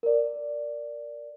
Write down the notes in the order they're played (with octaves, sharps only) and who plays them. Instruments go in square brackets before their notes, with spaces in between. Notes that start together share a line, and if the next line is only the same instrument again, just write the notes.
[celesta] A#4 D5